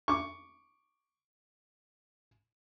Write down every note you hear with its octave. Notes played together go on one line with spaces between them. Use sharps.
C#6 D6